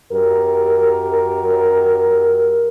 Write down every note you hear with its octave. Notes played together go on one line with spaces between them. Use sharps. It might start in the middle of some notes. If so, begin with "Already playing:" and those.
F#2 G4 A#4